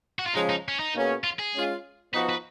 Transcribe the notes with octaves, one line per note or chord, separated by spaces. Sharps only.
F#4
F4
C#3 F3 G#3 C#4 D#4
D#4
C#4
D#4
B2 A#3 C#4 G#4
F4
G#4
G#3 C#4 F4
F3 B3 D#4 F#4 B4
B4